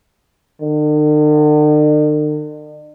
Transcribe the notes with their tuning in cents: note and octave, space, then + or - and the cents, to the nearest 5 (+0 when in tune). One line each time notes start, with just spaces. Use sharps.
D3 +45